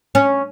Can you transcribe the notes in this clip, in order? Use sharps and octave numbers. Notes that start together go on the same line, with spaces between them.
C#4